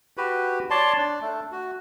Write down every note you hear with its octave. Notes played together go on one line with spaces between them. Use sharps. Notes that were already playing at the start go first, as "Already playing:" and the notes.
F#4 G4 B4
C#5 D5 A5 C6
D4
A3
F#4